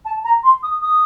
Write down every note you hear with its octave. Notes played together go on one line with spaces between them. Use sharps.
A5
A#5
C6
D#6
D#6